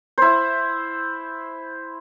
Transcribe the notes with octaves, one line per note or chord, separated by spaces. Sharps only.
E4 C5